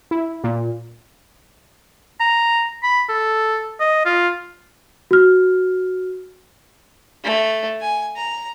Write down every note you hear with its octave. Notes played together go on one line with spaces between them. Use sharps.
E4
A#2
A#5
B5
A4
D#5
F4
F#4 F6
A3
G#5
A#5